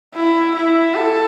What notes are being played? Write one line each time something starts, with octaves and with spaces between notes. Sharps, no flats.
E4
E4
A4